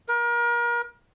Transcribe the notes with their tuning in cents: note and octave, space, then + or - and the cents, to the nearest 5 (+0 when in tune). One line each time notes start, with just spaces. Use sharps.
A#4 +35